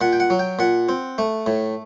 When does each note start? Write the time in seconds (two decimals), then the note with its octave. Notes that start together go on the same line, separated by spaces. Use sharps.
0.01 A#2 F#5
0.13 G5
0.20 F#5
0.30 F#3
0.39 G5
0.59 A#2 F#5
0.89 C4
1.18 A3
1.46 A2